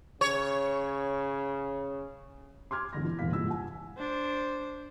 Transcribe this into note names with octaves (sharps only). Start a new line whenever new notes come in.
C#3 C#5
C6 D6 F6 G#6
G#1 E2 D3 A#6
E3
D#1 E2 C3 F5 B6
C#2 G2 E3 A#3 E6
F#5 G#5
D4 C5